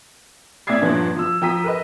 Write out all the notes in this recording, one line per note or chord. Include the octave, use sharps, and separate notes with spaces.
A2 D5 E5 D#6 G#6 C7
G2 A#2 F3 B3 C#4 D4
F3 E6
F3 G5 A#5 D#6 B6 D#7
A#4 B4 D#5